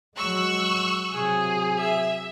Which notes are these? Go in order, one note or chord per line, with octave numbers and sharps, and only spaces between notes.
F#3 G#3 C#6 E6 F#6
C3 F#3 G#4
E5